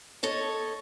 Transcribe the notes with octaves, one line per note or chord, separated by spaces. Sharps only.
A4 C#5 D#5